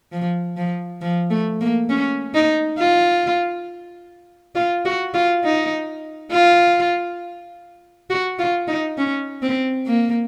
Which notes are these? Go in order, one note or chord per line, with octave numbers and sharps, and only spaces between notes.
F3
F3
F3
A3
A#3
C#4
D#4
F4
F4
F#4
F4
D#4
F4
F#4
F4
D#4
C#4
C4
A#3